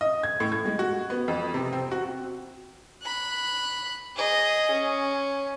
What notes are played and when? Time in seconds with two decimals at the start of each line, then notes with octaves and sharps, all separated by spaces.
0.01 D#5
0.23 G#6
0.40 A2
0.52 G#6
0.65 G#3
0.79 F#4
1.10 B3
1.28 F2
1.54 C3
1.73 C4
1.92 F#4
3.03 B5 F#6
4.16 G#4 D#5
4.72 C#4